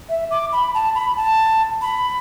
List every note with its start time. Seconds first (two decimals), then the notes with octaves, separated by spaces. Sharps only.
0.09 E5
0.31 D6
0.53 B5
0.74 A5
0.95 B5
1.17 A5
1.82 B5